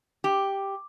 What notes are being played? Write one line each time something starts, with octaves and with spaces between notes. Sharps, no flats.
G4